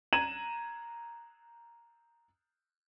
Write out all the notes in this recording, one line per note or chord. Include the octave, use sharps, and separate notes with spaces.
A#5 G#6 D#7 E7 F#7